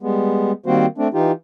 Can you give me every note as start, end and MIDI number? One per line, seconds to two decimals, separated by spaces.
0.03 0.52 55
0.03 0.52 56
0.03 0.52 59
0.66 0.86 51
0.66 0.86 55
0.66 0.86 58
0.66 0.86 60
0.66 0.86 66
0.66 0.86 72
0.98 1.08 57
0.98 1.08 60
0.98 1.08 62
1.14 1.32 52
1.14 1.32 63
1.14 1.32 65
1.14 1.32 67